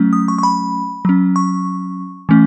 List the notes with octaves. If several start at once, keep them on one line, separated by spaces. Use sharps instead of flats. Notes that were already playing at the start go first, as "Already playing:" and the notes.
Already playing: F#3 A3 C#4
D#6
C#6
C#6
B5
F#3 C#4
C#6
E3 A3 C#4